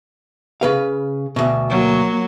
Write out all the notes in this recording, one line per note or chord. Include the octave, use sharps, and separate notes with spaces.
C#3 B4 F5
D2 B2
F#3 A#3